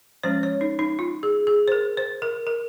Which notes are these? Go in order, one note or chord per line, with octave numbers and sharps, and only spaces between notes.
F3 G#3 C#4 C5
C#5
D#4
D#4
F4
G#4
G#4
C5
A#4
C5
A#4
A#4